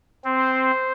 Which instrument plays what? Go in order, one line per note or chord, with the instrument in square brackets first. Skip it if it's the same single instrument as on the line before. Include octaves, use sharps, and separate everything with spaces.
[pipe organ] C4 [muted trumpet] C5